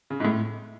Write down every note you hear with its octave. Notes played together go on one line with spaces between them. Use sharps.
C#3
G#2
A2